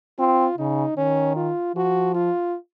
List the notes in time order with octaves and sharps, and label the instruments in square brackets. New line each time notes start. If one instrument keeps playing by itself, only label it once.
[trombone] C4 [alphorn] F4
[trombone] C#3 [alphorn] D#4
[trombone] D#3 [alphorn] C#4
[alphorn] F4
[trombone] F3 [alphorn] F#4
[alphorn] F4